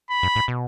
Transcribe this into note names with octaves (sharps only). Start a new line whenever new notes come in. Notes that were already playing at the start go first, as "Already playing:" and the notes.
B5
F#2
A2
B2